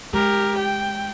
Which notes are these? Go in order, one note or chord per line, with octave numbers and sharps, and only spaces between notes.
G#3 G4 A#4
G5